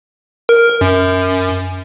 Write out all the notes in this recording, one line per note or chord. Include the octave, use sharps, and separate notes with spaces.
A#4
F#2